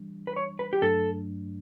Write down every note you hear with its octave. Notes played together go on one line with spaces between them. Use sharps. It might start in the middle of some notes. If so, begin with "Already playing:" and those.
Already playing: E3 G3 D4
B4
C#5
B4
G4
G2 F#3 A3 D4 A4